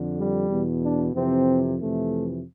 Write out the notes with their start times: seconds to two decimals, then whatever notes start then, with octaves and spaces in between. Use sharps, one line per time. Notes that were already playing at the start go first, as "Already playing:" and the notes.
Already playing: F2 D3
0.17 G3
0.50 E2 B2
0.82 D4
1.14 F2 C3 E3 C4
1.79 F2 C3 E3 A3